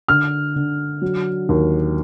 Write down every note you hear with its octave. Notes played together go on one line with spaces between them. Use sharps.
D3 F6
D3
F#3
D#2